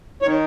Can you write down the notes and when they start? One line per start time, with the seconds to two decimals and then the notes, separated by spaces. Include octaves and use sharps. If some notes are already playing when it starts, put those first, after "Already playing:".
0.22 C#5
0.25 D#3